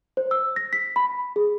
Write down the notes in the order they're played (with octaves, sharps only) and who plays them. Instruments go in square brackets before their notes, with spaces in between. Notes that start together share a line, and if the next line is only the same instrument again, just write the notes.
[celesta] C5
E6
A#6
B6
B5
G#4